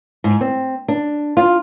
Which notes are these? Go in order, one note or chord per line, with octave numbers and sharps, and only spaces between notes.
G#2
C4
D4
F4